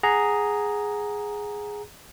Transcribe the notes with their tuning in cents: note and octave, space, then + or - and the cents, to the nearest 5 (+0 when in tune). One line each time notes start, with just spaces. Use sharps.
G#4 +0 F#5 +0 A#5 +0